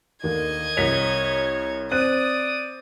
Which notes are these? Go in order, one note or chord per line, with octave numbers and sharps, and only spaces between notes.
D#2 D3 D#5 G#6
C2 C#5 B6 F7
C4 D5 D#6 F#6 D#7